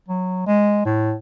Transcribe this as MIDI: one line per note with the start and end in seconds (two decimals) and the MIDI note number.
0.09 0.46 54
0.47 0.86 56
0.86 1.13 45